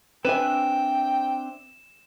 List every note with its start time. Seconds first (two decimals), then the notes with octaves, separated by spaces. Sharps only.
0.25 C4 D4 B4 E5 G5 G#5 E7